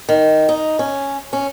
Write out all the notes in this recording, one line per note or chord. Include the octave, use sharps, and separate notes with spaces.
D#3
D#4
C#4
C#4